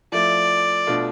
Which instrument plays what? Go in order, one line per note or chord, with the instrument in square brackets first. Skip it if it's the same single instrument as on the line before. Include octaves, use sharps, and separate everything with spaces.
[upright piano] F3 A3 E4 [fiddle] D5
[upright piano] B2 A3 D4 F4